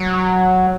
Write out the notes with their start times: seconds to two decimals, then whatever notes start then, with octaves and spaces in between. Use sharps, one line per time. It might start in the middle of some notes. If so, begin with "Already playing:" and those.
Already playing: F#3